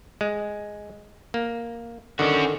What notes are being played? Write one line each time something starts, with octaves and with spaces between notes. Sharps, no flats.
G#3
A#3
D3 D#3 C#4 F#4